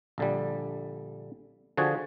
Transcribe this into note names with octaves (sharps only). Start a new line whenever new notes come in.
A#1 D3 G3
D3 F3 F#4 G#4